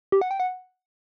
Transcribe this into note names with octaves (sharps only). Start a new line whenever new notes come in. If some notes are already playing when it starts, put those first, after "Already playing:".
G4
F#5
G5
F#5